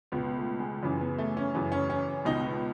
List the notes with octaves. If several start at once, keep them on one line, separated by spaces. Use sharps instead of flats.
C#2 B2 B3
A3
G#3
F#2 C#3 E3
B3
A3
C#4
F#2 C#3 E3
C#4
C#4
C#2 B2 D#4
B3